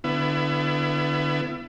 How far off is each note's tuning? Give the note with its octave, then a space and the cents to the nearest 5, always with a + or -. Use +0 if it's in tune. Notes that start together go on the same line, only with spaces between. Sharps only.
D3 +0 B3 +25 E4 +30